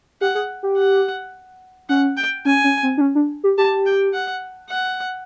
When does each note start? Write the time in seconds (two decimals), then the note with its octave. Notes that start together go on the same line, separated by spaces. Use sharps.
0.21 G4 F#5
0.35 G#4
0.63 G4
0.77 F#5
1.89 C#4 F#5
2.17 G5
2.45 C#4 G#5
2.64 C#4
2.83 C4
2.98 D4
3.01 C#4
3.15 D4
3.44 G4
3.58 G4 A5
3.86 G5
4.13 F#5
4.70 F#5